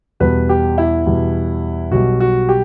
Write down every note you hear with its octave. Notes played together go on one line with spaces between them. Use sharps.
E2 B2 G3 B4
G4
E4
E2 B2 G3
B1 B2 G3 F#4
F#4
G4